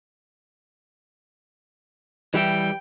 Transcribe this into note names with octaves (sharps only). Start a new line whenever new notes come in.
E3 G3 E4 G5